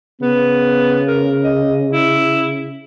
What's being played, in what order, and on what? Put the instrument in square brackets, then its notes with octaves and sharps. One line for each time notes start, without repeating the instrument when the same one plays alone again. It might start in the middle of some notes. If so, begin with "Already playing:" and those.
[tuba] C#3 [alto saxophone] B3
[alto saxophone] A#4
D#5
E4